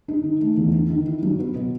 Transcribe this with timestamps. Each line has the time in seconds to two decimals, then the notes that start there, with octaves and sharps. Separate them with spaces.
0.08 D#4
0.24 D#3
0.41 A3
0.57 E2
0.73 D#4
0.90 D#3
1.07 E4
1.23 F#3
1.39 B3
1.56 B2